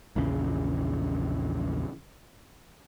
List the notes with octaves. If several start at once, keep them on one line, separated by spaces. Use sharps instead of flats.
A#1 E2 C#3